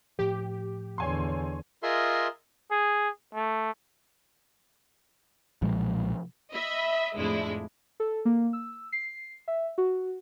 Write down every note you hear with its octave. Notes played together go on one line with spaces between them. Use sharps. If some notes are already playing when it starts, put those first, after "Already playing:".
A2 F3 G4
E2 D3 C#5 G#5 C6
F4 G#4 A#4 D#5 E5 C6
G#4
A3
B1 A#2 F3 G#3
D#5 E5 B5
F2 A2 G#3 D4 E4
A4
A#3
E6
C7
E5
F#4